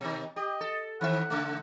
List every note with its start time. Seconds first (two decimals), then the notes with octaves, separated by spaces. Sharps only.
0.01 B2 D#3
0.36 G4 D#5
0.61 A4
1.01 D#3 C4 E5 F#5
1.30 C#3 A3